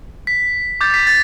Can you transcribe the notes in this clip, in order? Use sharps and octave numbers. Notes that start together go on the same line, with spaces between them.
B6
D6 G6 A6
B6
A6